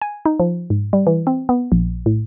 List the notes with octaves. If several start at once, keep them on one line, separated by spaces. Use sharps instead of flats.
G#5
D#4
F3
G#2
G3
E3
C4
B3
A#1
A2